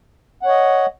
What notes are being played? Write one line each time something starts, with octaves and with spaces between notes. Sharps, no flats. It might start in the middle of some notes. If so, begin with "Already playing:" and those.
C#5 D#5 F#5